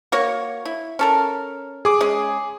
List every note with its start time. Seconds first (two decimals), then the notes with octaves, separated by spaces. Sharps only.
0.12 A#3 F#4 C#5
0.65 E4
0.99 C#4 A4 A#4
1.85 G#4 D6
2.01 G#3 C#4